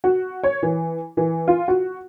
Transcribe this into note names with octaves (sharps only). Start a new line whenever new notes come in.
F#4
C#5
E3
E3
F4
F#4